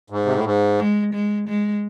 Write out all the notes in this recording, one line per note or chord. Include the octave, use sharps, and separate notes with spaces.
G#2
C3
A2
G#2
G#3
G#3
G#3